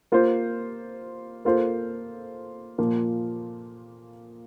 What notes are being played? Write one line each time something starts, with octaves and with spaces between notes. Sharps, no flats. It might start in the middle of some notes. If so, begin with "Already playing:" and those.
A#3 F4 C5
A#3 F4 A4 C5
A#2 F3 A#3 F4